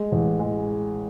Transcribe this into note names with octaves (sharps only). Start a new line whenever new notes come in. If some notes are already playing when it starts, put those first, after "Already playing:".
Already playing: G#3
A1
G#3